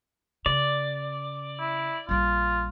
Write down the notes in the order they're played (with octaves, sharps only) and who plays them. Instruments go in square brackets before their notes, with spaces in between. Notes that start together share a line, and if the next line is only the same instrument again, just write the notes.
[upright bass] C#3 [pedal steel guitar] D5
[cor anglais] E4
[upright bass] A#1 G3 [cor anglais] F4